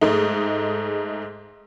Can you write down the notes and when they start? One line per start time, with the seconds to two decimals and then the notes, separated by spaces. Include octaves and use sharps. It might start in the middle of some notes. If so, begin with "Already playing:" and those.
0.01 G#2 G#3 A3 D#4